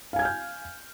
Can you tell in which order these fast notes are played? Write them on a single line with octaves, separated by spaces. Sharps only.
F5 G#5 G#6 F6 G6